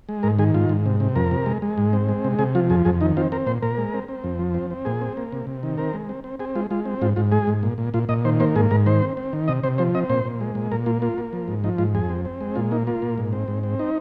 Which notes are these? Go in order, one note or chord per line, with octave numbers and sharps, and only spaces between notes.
G#3
G#2 A#4
D#3 G#4
G#2 F4
G#2
C3
C3
F2 A#4
C3
G#3
G#3
G#2
C4
G#3
C3
C3 G#4
F3 F4
F2 G#4
F2 G#4
D#3 D#4
C4 F4
C4 A#4
A#2 C5
A#2 A#4
G#3
C4
C4
F2
F3
C4
C4
A#2 G#4
C4
A#3
C3
C3
D#3
C4 A#4
G#3
C4
C4
C4 G#4
G#3 F4
G#3 F4
C4
G#2 F4
G#2 F4
G#3 G#4
G#2
A#2
A#2
A#2 F4
A#2 D#5
D#3 C5
A#3 C5
G#2 G#4
G#2 A#4
D#3 C5
C4
C4
D#3
C3 D#5
C3 C5
F3 C5
C4 D#5
A#2 C5
A#2
G#3
A#2
A#2 A#4
A#3 F4
A#3 F4
A#3
F3
G#2
F3 D#4
G#2 F4
F2 G#4
C4
C4
G#3
A#2 F4
A#3 D#4
A#3 F4
A#2
G#2
C4
G#2
C4
D#4